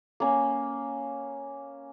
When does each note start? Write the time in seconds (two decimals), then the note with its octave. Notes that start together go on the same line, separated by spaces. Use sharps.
0.20 A#3 C#4